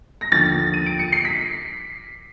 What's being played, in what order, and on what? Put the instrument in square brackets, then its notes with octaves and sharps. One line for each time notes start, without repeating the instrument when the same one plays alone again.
[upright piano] A#6
D#2 D3 F3 A#3 A6
D#7
D7
C#7
C7
B6